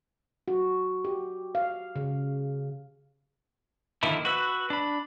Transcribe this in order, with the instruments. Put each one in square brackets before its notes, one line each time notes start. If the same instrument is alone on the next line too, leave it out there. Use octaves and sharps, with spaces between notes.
[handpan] F#4
G4
F5
C#3
[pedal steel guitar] D3 D#3 F3 A#3 E4
F#4 B4 E6
D4 B5